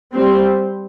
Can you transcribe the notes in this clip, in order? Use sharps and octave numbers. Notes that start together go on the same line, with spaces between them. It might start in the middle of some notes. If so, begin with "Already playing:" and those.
G3 C4